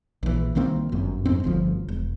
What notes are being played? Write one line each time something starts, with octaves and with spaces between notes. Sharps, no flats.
A#1 E3
C2 D#3 A#3 C4
G1 F#2
F2 G#2 C4
G1 D2 F3
E1